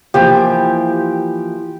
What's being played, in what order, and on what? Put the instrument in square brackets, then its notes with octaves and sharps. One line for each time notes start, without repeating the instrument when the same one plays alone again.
[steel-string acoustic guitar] E3 F3 A#3 [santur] G4